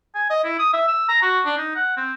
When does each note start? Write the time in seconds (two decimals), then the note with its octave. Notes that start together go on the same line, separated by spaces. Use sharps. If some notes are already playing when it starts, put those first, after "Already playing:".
0.15 G#5
0.30 D#5
0.44 E4
0.59 D#6
0.73 E5
0.88 E6
1.09 A#5
1.22 F#4
1.45 D4
1.58 D#4
1.75 F#5
1.97 C4